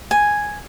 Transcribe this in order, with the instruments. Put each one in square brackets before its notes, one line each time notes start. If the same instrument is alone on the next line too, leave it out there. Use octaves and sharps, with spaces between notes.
[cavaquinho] G#5